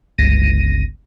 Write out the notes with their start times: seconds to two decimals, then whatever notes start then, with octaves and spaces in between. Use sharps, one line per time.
0.18 G1 C#2 A#6 D#7